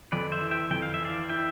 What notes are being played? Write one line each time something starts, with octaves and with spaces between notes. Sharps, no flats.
F2 B4 D5
C5 E5
E3
E5 G5
F2 G5
F5
E5
E3 D5 F5
E4 E5 G5